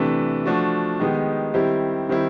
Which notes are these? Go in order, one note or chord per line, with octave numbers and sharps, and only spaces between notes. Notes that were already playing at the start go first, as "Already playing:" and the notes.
Already playing: C3 E3 A3 D4
F3 A3 D4 F#4
D#3 G#3 B3 D#4 G4
D#3 G3 C4 E4 G4
D#3 G3 C4 E4